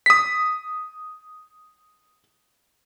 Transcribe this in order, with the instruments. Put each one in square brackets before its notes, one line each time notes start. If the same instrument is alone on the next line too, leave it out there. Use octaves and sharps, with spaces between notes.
[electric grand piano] D#6 B6